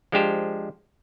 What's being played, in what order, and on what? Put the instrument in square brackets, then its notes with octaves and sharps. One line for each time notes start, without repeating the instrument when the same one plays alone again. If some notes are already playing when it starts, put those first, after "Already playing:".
[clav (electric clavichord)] F3 G#3 D4 G4 C5